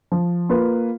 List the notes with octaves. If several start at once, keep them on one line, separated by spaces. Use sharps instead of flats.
F3
A#3 F4 B4